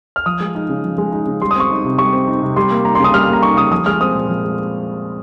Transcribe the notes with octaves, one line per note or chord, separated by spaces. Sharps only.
F6
F3 D#6
G#3
D#4
C#3
F3
G#3
D#4
C#3
G3 C6
D#6
C4 C#6
D#4
C3
G3 C#6
C4
D#4
C3
G3 C6
A#3
D#4 A#5
C6
C#3
D#6
G3 F6
F6
A#3
A#5
D#4 C#6
C#3 D#6
F3 D#6
G#3 F6
C4 D#6
A#2
F3
G#3